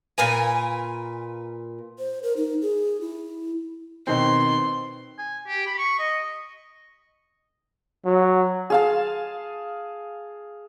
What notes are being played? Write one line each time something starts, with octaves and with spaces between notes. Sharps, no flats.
A#2 A#4 B4 G#5
C5
A#4
D#4
G#4
E4
B2 D#3 C4 C6
G#5
G4
B5
C#6
D#5
F#3
G#4 F5 A5